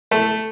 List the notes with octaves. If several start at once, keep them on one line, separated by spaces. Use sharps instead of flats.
A3